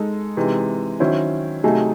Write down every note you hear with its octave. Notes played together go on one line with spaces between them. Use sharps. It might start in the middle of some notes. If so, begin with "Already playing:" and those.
Already playing: G#3 D#4 A4
C3 E3 G#3 D#4
D#3 F#3 C#4 E4 C5
C3 F#3 A3 D#4 G#4